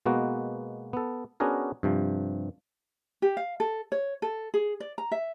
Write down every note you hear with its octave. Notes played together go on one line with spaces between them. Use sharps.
B2 G#3 A#3 B3 F#4
B3 A4
B3 C#4 D4 F#4 G#4 A#4
G2 C3 F3
G4
F5
A4
C#5
A4
G#4
D5
A#5
E5